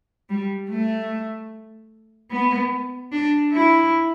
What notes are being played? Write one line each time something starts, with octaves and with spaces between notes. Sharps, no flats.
G3
A3
B3
D4
E4